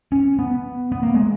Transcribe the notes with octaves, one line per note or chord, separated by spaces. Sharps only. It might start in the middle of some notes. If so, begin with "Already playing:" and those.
C#4
B3
B3
A#3
G#3